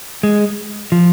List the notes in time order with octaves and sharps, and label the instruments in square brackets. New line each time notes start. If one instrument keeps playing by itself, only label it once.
[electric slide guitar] G#3
F3